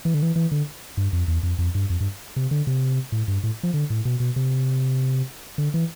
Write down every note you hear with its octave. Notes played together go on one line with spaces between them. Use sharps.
E3
D3
E3
E3
D3
G2
F2
E2
F2
F2
G2
F2
G2
C3
D3
C3
A2
G2
A2
F3
D3
A2
B2
B2
C3
D3
E3